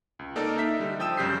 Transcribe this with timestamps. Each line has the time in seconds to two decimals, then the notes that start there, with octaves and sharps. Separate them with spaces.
0.19 C#2
0.36 A#3 D#4 A4 A#4 D5
0.58 D#4 E5 B6
0.79 D3 G3
1.00 F3 G5 D#6 E6 E7
1.17 F#2 C#3 G3 G6 B6 C7